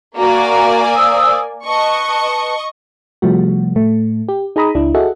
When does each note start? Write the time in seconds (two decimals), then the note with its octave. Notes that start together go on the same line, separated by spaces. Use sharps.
0.17 A#3 F#4 D5 G#5 A#5
0.95 C5 D#6 E6
1.65 B4 D#5 A5 C#6
3.22 C3 F3 G3 A3 F#4
3.75 A2 A3
4.29 G4
4.56 D#4 G#4 D#5 A#5 B5 D#6
4.75 C#2 D4 E4
4.94 F#4 G#4 A4 D#5 E5 F#5